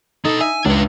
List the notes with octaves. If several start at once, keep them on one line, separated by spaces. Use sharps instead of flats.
B2 D#4 A4
E5 G#5
C#2 D4 B4